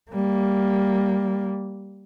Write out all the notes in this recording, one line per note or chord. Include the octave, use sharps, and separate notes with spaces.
G3 A#3